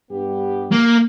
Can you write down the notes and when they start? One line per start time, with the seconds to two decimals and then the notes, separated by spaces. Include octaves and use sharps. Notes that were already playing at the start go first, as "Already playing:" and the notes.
0.12 G2 B3 G4
0.72 A#3